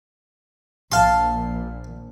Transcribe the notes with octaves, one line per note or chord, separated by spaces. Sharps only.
A#1 A#2 F5 A5 C6